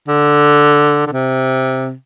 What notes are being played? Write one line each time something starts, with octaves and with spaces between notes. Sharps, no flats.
D3
D3
C3